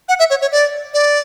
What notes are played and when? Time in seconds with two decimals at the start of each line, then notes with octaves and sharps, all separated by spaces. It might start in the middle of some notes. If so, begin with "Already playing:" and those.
0.09 F#5
0.19 E5
0.30 C#5
0.41 C#5
0.52 D5
0.94 D5